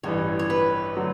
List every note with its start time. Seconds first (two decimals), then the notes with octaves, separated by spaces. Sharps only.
0.03 A1 G2 E3 C#5
0.39 C#5
0.50 B4
0.96 D3 F#3 A3